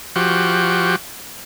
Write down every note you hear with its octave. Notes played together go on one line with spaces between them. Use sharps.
F3 F#4 G4